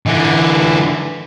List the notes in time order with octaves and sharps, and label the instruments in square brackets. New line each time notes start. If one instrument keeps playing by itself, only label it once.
[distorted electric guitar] D3 E3